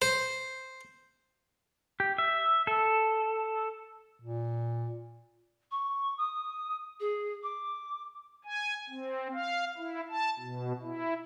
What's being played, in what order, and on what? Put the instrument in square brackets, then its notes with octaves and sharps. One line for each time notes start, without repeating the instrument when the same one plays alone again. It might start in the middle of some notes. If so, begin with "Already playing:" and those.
[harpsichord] C5
[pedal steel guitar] G4
E5
A4
[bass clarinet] A#2
[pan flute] C#6
D#6
G#4
D6
[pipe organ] G#5
C4
F5
E4
A5
B2
E4